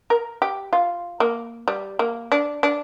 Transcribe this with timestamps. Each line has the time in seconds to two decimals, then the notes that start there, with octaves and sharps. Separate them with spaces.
0.10 A#4
0.42 G4
0.73 F4
1.20 A#3
1.68 G3
1.99 A#3
2.32 D4
2.63 D4